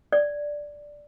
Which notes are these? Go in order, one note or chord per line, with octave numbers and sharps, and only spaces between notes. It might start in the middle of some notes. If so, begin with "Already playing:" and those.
D5